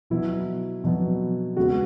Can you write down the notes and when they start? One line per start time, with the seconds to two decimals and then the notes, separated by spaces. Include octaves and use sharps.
0.10 B2 F#3 B3 E4
0.84 B2 F#3 B3
1.57 C#3 G#3 B3 F#4